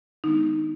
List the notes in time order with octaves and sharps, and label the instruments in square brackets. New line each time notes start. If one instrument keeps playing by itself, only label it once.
[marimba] D#3 G#3 B3 D4 D#4